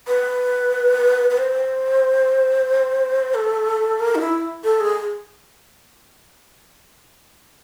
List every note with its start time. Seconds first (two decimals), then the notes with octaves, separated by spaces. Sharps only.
0.07 B4
1.30 B4
1.38 C5
3.34 A4
3.99 A#4
4.15 D#4
4.21 E4
4.64 A4
4.80 G#4